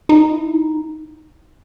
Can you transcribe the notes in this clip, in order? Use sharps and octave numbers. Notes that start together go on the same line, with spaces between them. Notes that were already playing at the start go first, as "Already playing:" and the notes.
D#4
E4
D#4